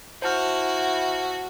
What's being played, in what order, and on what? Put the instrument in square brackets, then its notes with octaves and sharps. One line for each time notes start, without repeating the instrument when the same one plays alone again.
[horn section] E4 [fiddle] F#4 [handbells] C5 A5 F6